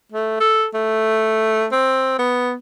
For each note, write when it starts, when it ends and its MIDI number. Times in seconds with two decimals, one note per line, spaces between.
0.12 0.39 57
0.40 0.66 69
0.74 1.66 57
1.72 2.19 60
2.19 2.53 59